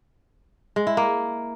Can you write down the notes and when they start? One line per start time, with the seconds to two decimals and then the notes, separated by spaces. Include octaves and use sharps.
0.76 G#3
0.87 E4
0.97 A#3